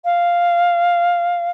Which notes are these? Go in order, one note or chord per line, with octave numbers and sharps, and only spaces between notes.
F5